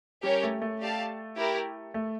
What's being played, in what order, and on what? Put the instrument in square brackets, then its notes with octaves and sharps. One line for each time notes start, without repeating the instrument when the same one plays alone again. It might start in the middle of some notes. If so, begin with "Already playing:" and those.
[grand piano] G3 [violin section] C#4 G4 A#4 C#5
[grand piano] A3
A3
[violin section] G4 D5 F5 A5
E4 G4 A#4
[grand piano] A3